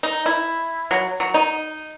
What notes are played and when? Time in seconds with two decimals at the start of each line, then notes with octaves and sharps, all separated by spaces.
0.03 D#4
0.26 E4
0.91 F#3
1.20 F#3
1.34 D#4